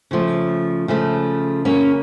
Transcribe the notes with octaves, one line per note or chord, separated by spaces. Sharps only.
C#3 F3 A3
C#3 F3 A3
C#3 F#3 A#3 C#4